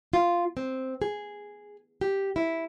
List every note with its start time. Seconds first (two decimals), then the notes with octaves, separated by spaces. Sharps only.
0.13 F4
0.57 C4
1.02 G#4
2.01 G4
2.36 E4